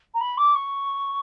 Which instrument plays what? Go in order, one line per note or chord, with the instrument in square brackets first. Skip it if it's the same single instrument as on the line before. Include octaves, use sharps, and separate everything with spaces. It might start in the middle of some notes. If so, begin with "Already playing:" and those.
[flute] A#5
B5
D6
C#6